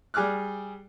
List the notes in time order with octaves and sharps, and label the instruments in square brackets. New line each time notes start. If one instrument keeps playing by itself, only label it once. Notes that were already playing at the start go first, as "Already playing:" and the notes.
[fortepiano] G3 G#4 D6 F6 F#6